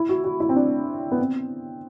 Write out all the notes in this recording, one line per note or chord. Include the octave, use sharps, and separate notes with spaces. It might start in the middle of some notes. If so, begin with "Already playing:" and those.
Already playing: E4
F#4
F#4
E4
C4
D4
B3
C4